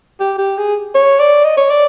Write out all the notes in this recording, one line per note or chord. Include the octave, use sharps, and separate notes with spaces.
G4
G4
G#4
C#5
D5
D#5
C#5
D5